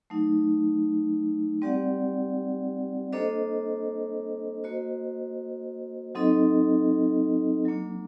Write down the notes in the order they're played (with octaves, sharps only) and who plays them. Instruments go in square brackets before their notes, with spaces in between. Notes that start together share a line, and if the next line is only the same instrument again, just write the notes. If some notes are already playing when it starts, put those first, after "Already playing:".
[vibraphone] F#3 A3 D#4
G3 C4 G4 D5 F#5
A#3 D4 A4 C5 D#5
A#3 F#4 C5 D#5
F#3 C4 D#4 A4 D#5
F#3 A#3 D4